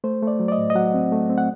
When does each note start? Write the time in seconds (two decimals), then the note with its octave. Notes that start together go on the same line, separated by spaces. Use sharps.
0.04 A3 C5
0.22 A3
0.27 D5
0.40 F#3
0.48 D5
0.52 D#5
0.58 A2
0.70 D#5
0.75 F#3 F#5
0.94 C4
1.12 A3
1.30 C4
1.38 F#5